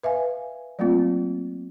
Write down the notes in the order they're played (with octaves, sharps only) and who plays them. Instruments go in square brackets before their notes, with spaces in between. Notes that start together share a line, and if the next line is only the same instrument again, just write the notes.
[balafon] B4 E5 F5 G#5
F#3 A3 A#3 C4 F4